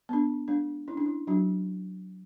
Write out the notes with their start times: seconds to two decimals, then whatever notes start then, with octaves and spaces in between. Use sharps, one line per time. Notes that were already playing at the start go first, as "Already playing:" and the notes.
0.09 B3 D4
0.48 G#3 D4
0.88 C#4 E4
0.97 D4
1.06 E4
1.27 F#3 D4 F#4